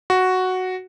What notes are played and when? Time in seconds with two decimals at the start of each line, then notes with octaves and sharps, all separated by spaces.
0.10 F#4